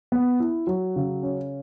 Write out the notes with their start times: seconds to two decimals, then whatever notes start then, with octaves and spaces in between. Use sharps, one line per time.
0.12 B3
0.40 E4
0.67 F#3
0.96 C#3
1.23 C#4